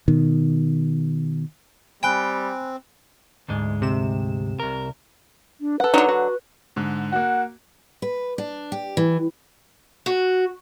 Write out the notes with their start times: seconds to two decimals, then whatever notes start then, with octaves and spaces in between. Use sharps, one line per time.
0.08 B2 D#3
2.03 G3 C4 G5 G#5 B5 F#6
3.48 D2 G#2 G#3
3.82 C3 E7
4.60 C2 A#4
5.61 D4
5.80 A4 B4 F#5
5.94 D3 F#3 D4 D#4
6.09 F#4
6.76 G#2 D3
7.12 A#3 F#4 F#5
8.02 B4
8.38 D4
8.72 G4
8.97 E3
10.06 F#4